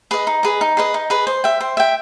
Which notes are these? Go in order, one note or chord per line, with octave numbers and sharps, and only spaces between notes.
G#4 B4 D#5
D#4
G#4 B4 D#5
D#4
G#4 B4 D#5
D#4
G#4 B4 D#5
C5
E5 G5
C5
E5 G5